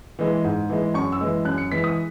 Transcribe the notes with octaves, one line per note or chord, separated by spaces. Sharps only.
E3 G#3
G#2
E3 G#3
F#2 C#6
E6
E3 G#3
F#2 F#6
C#7
E3 G#3 B6
D#6